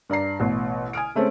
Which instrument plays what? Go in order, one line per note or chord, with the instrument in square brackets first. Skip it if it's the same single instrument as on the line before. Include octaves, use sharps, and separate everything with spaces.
[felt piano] G2 D5 A#5 C7
A1 B2
G#5 D#6 F6 D7
G#3 A3 C4 C#4 A4